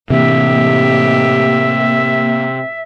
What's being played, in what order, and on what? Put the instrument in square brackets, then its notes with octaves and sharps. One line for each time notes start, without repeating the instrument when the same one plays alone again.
[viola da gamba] A2 D#4 G4 [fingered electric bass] C3 E3 [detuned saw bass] A#3 [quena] E5